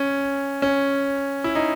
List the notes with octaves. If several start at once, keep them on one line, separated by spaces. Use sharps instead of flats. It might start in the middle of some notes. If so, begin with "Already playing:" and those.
Already playing: C#4
C#4
E4
D#4